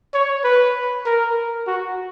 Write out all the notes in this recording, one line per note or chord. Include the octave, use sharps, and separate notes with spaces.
C#5
B4
A#4
F#4